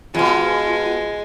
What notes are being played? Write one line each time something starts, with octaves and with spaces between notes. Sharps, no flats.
F2 B2 G#3 F4